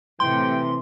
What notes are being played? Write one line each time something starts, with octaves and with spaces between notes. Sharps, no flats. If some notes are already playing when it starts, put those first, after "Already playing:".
A2 C3 E3 G5 C6